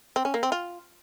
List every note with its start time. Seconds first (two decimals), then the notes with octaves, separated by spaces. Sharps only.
0.16 C4
0.25 C#4
0.34 A#3
0.43 C4
0.52 F4